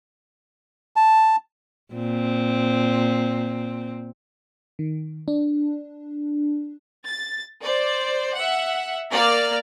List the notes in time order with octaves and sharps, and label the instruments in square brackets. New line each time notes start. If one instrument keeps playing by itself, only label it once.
[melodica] A5
[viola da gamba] A#2 C4
[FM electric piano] D#3
D4
[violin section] A6
C5 D5
E5 F#5
A#3 D5 F6